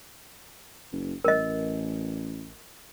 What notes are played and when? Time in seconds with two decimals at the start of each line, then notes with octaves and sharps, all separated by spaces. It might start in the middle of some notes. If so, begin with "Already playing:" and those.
0.92 F#1
1.24 A1 A#4 D#5